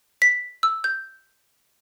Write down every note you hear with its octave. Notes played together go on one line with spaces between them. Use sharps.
B6
E6
G6